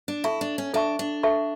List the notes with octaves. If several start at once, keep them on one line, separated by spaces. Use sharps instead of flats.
D4
E4 A4 E5 A5 C#6
D4
C#4
D4 A4 E5 A5 C#6
D4
A4 E5 A5 C#6